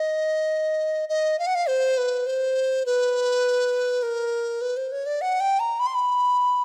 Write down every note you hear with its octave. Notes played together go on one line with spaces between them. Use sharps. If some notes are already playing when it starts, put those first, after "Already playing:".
Already playing: D#5
D#5
F5
F#5
F5
C5
B4
C5
B4
A#4
B4
C5
C#5
D5
F#5
G5
A#5
B5
C6
B5